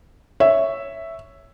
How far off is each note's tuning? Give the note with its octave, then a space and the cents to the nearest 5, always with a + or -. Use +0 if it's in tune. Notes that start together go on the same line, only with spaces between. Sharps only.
C#5 +0 E5 +0